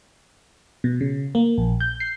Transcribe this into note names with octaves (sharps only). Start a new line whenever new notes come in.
B2
C#3
A#3
A#1
G6
C7